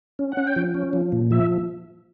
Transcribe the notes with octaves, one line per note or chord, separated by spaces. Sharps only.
C#4
C#4 F#5
G5
F3
C#4
F3
A#2
F3 E5